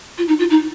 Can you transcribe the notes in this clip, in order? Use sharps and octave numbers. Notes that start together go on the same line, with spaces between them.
F4
D#4
F4
D#4